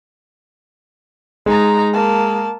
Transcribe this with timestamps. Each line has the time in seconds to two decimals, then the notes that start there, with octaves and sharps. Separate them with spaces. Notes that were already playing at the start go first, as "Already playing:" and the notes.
1.46 G#3 D#4 A#5
1.93 A#3 A5